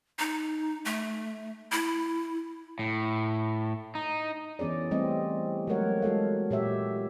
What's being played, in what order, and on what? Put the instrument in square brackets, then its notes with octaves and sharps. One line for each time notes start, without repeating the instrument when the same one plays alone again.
[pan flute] D#4
A3
E4
[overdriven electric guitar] A2
D#4
[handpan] E3 B3 C#4 G#4 D5
G3 A3 C4 C#4 D#5
F#3 G#3 A3 A#4 C#5 F#5
G#3 F#4 A4 F5
A#2 G4 C#5 E5